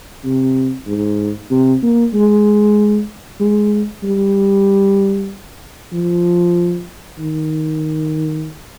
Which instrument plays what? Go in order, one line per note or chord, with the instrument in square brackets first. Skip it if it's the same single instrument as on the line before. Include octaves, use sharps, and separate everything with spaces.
[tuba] C3
G#2
C3
A#3
G#3
G#3
G3
F3
D#3